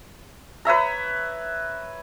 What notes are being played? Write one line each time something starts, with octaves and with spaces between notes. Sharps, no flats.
B4 C#5 E5 A#5